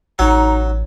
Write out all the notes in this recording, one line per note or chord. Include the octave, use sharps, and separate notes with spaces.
A1 F#3 D#4